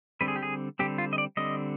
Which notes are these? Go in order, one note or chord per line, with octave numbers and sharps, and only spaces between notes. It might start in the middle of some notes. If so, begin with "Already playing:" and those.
D3 G3 C4 B4
G#4
G4
G#4
D3 G3 C4 G4
F4
D#5
D5
D3 G3 C4 D#5